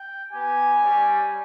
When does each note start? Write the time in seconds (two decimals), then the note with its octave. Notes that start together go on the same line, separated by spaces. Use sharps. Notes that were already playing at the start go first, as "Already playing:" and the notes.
Already playing: G5
0.32 B3 G4 G#5
0.81 G3 C#4 G4